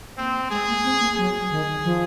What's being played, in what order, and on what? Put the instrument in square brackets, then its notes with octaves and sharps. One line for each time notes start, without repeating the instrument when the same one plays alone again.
[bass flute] A#3 [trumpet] C4
[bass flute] G#3 [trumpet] G#4
[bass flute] A#3
C4
A#3
[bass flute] F#3 [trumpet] G#4
[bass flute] D#3
F3